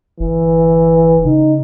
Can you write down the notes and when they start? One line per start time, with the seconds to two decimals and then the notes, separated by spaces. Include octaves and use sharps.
0.20 G1 E3
1.25 C#3 D#4